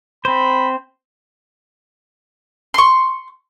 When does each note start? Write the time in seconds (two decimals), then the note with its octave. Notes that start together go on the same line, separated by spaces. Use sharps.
0.25 C4 C5 B5
2.74 C6 C#6